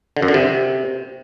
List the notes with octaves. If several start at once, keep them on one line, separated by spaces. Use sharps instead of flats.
D3
F#2
D3
C3